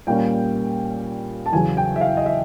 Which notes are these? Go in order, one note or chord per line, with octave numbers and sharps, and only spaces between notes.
A#2 G3 A#3 C#4 G5
A5
E2 C#3 F#3 G#5
G5
E5
F5
D#5
E5